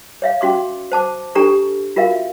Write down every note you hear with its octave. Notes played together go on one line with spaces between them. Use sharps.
C#5 E5 F5
C#4 F#4 C6 D6
C5 A5 D6
D4 G4 A4 A#5 C#6
F4 F#4 A#4 E5 F5